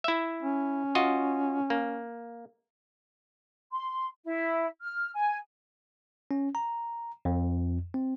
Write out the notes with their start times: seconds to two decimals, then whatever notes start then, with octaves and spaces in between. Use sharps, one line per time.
0.04 E4 E5
0.43 C#4
0.95 F4 F#4 D#5
1.70 A#3
3.71 C6
4.24 E4
4.81 F6
5.14 G#5
6.31 C#4
6.55 A#5
7.25 F2
7.94 C4